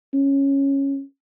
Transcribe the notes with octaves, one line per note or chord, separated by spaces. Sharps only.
C#4